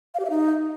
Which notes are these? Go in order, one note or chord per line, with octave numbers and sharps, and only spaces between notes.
F5
G4
E5
D#4